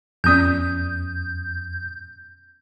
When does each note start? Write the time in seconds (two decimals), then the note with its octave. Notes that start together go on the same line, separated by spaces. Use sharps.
0.24 F2 B3 C#4 D5 D#6 G6